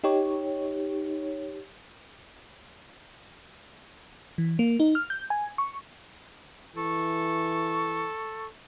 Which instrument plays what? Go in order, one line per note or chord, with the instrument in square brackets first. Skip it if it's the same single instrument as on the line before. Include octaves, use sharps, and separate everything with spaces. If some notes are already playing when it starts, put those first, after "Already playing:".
[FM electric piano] D#4 G4 C#5
E3
A#3
D#4
F6
G6
G#5
C#6
[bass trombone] E3 [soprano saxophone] A4 [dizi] C#6